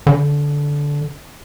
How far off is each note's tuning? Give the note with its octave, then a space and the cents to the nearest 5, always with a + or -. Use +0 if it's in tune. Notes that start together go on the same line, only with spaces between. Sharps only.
D3 -15